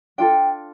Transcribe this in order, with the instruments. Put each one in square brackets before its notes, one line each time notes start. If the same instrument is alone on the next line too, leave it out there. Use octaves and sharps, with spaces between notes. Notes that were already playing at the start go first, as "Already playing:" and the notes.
[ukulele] D4 F4 A4 G5